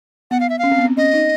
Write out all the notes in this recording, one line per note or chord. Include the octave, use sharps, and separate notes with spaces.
B3 F#5
F5
E5
C#4 F5
C4
B3
C4
C#4 D#5
D#4